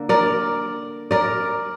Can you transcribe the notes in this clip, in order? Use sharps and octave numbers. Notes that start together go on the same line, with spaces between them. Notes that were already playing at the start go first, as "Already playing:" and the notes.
Already playing: D3 A#3
A#4 D5
A#4 D5